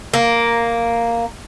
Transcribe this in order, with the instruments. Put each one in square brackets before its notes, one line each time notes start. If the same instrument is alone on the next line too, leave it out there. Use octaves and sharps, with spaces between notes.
[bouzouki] A#3